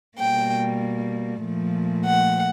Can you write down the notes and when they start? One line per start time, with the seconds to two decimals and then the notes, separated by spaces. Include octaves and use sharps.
0.17 B2 G3 A#3 G5
1.43 A#2 F3 A3
2.05 F#5